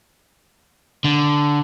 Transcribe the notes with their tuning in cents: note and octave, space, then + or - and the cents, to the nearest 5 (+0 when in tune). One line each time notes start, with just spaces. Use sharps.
D3 -5